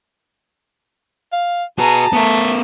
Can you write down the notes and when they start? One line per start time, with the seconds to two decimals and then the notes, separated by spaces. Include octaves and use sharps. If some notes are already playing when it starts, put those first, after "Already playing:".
1.33 F5
1.79 F#4 G#4 B4 A5 A#5
2.13 A3 B3 A#4